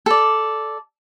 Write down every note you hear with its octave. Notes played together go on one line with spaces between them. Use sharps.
A4 D5